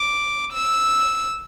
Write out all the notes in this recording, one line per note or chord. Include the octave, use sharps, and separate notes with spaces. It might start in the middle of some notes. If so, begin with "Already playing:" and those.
Already playing: D6
E6